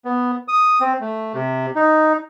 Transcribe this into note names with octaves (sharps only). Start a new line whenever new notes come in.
B3
D#6
C4
A3
C3
D#4